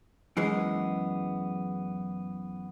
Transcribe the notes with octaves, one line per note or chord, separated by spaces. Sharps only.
F#2 E3 G#3 B3